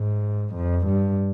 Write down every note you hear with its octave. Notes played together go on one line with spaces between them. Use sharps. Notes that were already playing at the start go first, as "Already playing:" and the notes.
Already playing: G#2
F2
G2